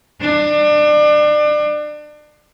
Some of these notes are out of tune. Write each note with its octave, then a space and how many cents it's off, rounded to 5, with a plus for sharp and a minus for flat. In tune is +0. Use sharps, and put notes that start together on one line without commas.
D4 +30